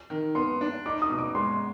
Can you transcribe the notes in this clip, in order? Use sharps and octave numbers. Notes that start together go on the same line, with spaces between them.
D#3
B3 C6
D4
D#4 D6
D#6
B2
D6
G#3 C6